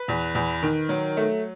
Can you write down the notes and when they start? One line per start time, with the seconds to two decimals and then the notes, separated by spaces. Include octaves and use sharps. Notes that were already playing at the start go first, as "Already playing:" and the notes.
Already playing: B4
0.08 E2
0.35 E2
0.63 D#3
0.89 F#3
1.17 A3